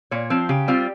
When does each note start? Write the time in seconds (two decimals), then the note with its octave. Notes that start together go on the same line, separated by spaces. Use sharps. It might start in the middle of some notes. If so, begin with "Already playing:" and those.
0.11 A#2 C#5
0.30 F3 C4
0.49 C#3 G4
0.68 G3 C4 F4